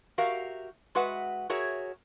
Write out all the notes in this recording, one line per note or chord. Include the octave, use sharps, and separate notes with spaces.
F#4 G4 A#4 E5 F5
G#3 F#4 B4 E5 F#5
F#4 G#4 A#4 C#5 E5